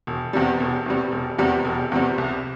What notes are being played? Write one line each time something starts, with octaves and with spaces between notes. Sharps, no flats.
E1
E2 C3 G3
E1
E2 C3 G3
E1
E2 C3 G3
E1
E2 C3 G3
C2